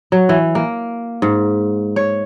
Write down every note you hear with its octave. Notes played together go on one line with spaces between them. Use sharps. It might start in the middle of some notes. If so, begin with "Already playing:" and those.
F#3
E3
A#3
G#2
C#5